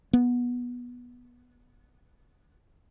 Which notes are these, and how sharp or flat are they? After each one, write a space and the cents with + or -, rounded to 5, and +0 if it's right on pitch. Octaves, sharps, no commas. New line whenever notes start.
B3 -15